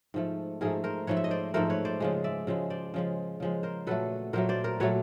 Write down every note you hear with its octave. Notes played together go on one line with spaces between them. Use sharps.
G#2 F3 A3
G#2 F3 A3 G#4 A#4
A#4 C5
G#2 F3 A3 B4 C#5
E5
D#5
C5 D5
G#2 F3 A3 A#4 C5
B4 C#5
C5 D5
C#3 F3 G#3
D5 E5
C#3 F3 G#3
C5 D5
C#3 F3 G#3
C#3 F3 G#3
A#4 C5
A#2 F#3 A3 A4 B4
A#2 F#3 A3 A#4 C5
C5 D5
A#4 C5
A#2 F#3 A3 B4 C#5